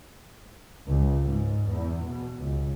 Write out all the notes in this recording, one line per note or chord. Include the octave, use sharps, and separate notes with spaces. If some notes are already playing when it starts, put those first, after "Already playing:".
C#2
G#2
E2
B2
C#2